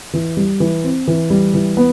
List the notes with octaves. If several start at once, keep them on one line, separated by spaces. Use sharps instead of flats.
E3
G3
E3
C4
E3
G3
E3
B3